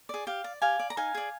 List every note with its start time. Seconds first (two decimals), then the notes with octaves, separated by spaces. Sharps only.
0.09 G#4 D5
0.27 G4 F5
0.44 D5
0.62 G4 F5 G#5
0.79 D5
0.90 A#5
0.97 D#4 F5 G#5
1.15 G#4 D5